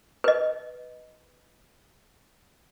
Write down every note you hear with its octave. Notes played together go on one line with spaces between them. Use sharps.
B4 D#5